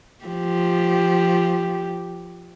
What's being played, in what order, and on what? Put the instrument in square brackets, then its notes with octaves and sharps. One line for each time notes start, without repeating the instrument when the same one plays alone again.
[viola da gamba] F3 G4